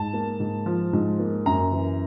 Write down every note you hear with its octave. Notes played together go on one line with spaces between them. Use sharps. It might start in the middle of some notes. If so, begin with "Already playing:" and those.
Already playing: G#2 A5
A#3
G#2
F3
G#2
A#3
F#2 A#5
E3